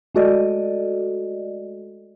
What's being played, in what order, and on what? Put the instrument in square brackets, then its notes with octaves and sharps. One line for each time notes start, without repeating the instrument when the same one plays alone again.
[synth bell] G#3 A3 F#4 A4 D5 D#5